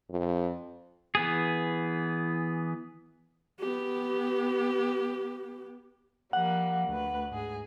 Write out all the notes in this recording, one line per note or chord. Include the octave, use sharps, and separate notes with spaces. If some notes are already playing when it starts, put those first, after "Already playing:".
F2
E3 B3 G#4
B3 G4
F3 G3 A#3 F#5
D2 B4
G#2 G#4